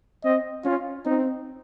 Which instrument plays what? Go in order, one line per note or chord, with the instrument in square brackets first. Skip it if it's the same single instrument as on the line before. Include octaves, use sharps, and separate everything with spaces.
[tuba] C4 [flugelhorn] D#5
[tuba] C#4 [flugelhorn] F4
[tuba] C4 [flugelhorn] D#4